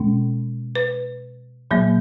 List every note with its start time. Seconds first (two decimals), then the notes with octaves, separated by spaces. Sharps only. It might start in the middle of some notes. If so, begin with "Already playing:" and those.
Already playing: B2 G#3 C#4
0.75 B4
1.71 A#2 F#3 A#3